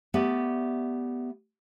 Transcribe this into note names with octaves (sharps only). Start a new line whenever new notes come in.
A3 B3 G4 D5 E5